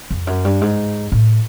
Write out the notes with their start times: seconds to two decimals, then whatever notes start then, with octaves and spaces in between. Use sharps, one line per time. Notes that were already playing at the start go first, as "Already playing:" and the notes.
0.11 F2
0.27 F#2
0.45 G2
0.61 G#2
1.12 A2